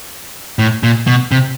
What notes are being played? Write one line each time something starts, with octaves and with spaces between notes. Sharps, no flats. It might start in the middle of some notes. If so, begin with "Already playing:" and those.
A2
A#2
B2
C3